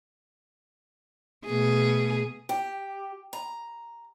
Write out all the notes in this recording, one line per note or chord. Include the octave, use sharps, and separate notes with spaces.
B2 A3 G#4
G4
A#5